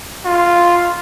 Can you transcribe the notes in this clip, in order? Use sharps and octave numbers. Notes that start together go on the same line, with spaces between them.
F4